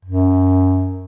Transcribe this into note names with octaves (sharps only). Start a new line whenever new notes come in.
F#2